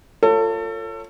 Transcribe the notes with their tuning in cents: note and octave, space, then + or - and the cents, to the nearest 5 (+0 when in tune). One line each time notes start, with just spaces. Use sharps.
F4 +0 A4 +30 C#5 +0